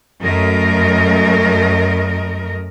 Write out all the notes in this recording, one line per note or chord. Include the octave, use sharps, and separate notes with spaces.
F#2 A3 A#4 D#5